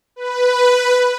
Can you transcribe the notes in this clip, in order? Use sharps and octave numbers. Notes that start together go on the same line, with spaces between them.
B4